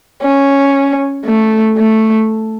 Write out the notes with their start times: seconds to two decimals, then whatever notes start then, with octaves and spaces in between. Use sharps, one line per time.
0.22 C#4
1.25 A3
1.77 A3